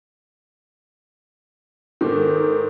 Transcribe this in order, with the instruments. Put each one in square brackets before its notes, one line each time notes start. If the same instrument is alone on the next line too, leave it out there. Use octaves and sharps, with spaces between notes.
[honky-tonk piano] G#2 D#3 [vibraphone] A4 A#4 D6